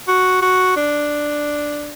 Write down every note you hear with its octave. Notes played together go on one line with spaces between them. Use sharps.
F#4
F#4
D4